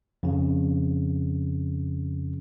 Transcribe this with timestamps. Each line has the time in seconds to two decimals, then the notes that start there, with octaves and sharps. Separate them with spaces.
0.23 F2 C#3